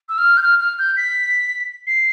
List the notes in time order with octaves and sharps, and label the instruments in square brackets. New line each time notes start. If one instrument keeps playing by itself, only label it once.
[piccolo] E6
F6
G6
F6
F6
G6
B6
C7